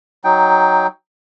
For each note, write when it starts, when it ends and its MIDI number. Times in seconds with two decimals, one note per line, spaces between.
0.24 0.87 54
0.24 0.87 63
0.24 0.87 79